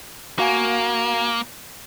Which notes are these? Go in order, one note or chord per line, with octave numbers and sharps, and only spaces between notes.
A#3 F#4 F5 G#5